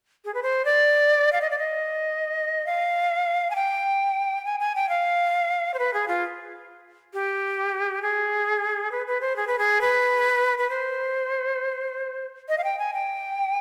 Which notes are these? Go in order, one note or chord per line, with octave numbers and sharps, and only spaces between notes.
G#4
B4
C5
D5
F5
D#5
D5
D#5
F5
G#5
G5
G#5
G#5
G5
F5
C5
B4
G#4
F4
G4
G#4
B4
B4
C5
G#4
B4
G#4
B4
B4
C5
D#5
F5
G5
G#5
G5